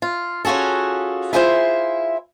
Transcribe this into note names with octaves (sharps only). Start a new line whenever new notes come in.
F4
C#4 F4 F#4 G#4 A4
E4 F4 G#4 C5 D#5 E5